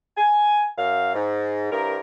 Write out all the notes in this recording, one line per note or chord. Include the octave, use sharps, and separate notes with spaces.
G#5
F#2 F5
G#2
C2 G2 A#4